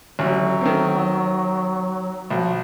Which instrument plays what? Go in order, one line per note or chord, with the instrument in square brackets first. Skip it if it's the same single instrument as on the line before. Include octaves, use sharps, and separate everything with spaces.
[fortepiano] A1 D2 [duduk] F#3
[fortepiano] D#3 A3 C4
[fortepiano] B1 [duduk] F3